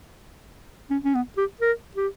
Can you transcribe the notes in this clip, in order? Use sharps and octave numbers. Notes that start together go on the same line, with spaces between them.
C#4
C#4
B3
G4
A#4
G4